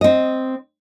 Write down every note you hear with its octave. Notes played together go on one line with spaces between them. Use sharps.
C4 D#5